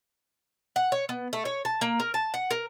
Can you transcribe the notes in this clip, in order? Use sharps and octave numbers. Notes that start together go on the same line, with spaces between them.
F#5
C#5
B3
A3
C#5
A5
A#3
A#4
A5
F#5
A#4